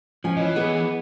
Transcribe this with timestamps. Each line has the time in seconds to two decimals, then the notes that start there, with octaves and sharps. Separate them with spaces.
0.24 F3 C#4 G#5
0.37 E3 C#5 D#5
0.56 B3 G#4